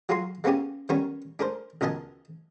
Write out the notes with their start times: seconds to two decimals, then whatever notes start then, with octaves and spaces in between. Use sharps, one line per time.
0.09 F#3 F4 F#4 G#4 A#5 C6
0.44 G#3 A#3 B3 C#4 G4 G#4
0.89 D#3 G3 B3 C#4 A#4 C#5
1.39 D4 G#4 A#4 C5
1.81 C#2 B2 A#4 D#5 G#5 A5